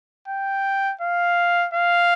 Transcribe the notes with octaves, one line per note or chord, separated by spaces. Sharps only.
G5
F5
F5